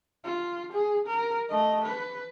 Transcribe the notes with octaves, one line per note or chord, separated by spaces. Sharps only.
F4
G#4
A#4
A3 D#5
B4